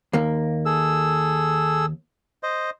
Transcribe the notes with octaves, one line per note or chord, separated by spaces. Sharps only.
D#2 A#3
G#4 A4 E6
C5 D#5